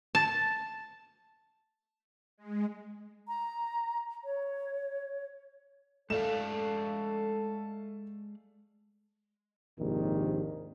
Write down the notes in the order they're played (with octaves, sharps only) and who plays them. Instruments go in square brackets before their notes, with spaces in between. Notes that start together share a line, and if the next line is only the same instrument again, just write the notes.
[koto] A5
[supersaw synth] G#3
[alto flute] A#5
C#5
[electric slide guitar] G#3 D5 F5 [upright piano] A3 E7 [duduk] A4
[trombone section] A#1 D#2 G#2 C3 D#3